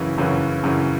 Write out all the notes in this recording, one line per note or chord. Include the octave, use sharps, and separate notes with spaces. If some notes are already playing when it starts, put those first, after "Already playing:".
Already playing: F#2 C#3 E3
F#2 C#3 E3
F#2 C#3 E3